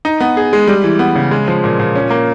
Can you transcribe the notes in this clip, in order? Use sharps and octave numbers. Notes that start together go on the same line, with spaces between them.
D#4
B3
G#4
G#3
G3
E3
B3
C#3
G#3
F3
A#2
A#2
C#4
A#3